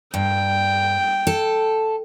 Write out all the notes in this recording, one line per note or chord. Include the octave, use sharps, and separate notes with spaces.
G2 G5
A4